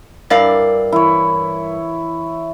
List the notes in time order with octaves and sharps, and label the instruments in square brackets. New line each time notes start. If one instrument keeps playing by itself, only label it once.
[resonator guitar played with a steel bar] G2 D5 F5 [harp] E4 A#4
[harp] E3 [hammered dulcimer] E4 C#5